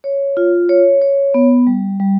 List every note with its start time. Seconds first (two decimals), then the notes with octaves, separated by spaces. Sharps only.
0.04 C#5
0.37 F4
0.69 C#5
1.02 C#5
1.34 B3
1.67 G3
2.00 G3